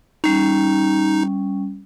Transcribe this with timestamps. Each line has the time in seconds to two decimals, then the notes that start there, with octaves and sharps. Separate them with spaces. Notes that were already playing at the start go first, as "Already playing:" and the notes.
0.24 G3 C#4 D#4